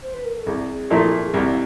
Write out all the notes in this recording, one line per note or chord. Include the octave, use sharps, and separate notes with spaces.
C5
B4
A#4
A4
C2 G#4
A#2 F3 A3
G#4
C2 G4